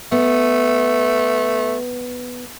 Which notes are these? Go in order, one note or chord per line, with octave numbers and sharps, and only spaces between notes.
A3 B3